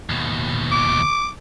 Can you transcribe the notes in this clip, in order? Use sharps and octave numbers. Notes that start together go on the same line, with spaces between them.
D#2 B2
D6